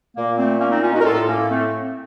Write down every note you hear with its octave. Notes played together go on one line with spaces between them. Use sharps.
A#2 A#3
A3 C4
A#3 C#4
C4 D#4
C#4 F4
D#4 F#4
A#4
A2 F4 A4
A#3 C#4
A3 C4